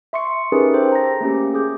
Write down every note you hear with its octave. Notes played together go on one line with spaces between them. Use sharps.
E5 C6 C#6 C#7
C#4 D#4 G4 G#4 A#4 B4
A4 C5 G5
A#5 A#6
A3 A#3 C#4 G4
G#4 D6 G6